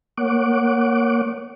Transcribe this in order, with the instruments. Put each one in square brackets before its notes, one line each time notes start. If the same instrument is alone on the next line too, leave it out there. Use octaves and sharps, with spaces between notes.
[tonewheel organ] A#3 C#5 F#5 D6